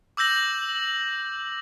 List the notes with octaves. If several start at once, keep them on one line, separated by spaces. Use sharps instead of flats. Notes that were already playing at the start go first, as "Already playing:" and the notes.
D6 E6 G6 A#6 F#7